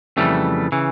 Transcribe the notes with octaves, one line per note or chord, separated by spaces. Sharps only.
F2 C#3 E3 G3 A3
C#3 E3